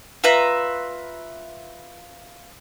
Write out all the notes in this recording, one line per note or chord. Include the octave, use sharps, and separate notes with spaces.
F4 B4 E5 A#5